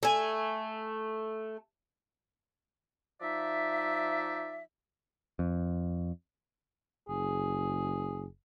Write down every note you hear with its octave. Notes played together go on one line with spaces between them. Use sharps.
A3 G#5
F3 D#4 D5 E5
F2
F#1 G#4